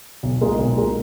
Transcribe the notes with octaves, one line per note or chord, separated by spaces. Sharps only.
B1
A#2 G#3 D#4 A#4
B1
A#2 G#3 D#4 A#4